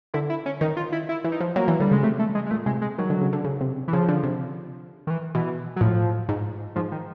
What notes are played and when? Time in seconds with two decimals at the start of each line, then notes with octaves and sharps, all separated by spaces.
0.14 D3 E4
0.30 E4
0.46 C#4
0.61 D#3 D#4
0.77 F4
0.92 E4
1.09 E4
1.24 E3
1.32 D#4
1.40 F3
1.56 F#3 A#3
1.68 E3
1.80 D3 G3
1.92 C#3 G#3
2.03 C3 A3
2.19 A3
2.35 G#3
2.46 G#3
2.51 A#2 A3
2.66 C3 G#3
2.82 G#3
2.98 D#3 F#3
3.10 D3
3.21 C#3
3.33 D3
3.45 C#3
3.61 C3
3.88 E3
3.93 C#3 F3
4.08 D3
4.23 C3
5.07 D#3
5.10 E3
5.35 B2 E3
5.76 F#3
5.81 A2 F3
6.29 G#2
6.76 G#2 F3
6.92 D#3